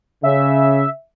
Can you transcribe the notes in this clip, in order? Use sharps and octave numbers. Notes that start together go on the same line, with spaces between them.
C#3 E5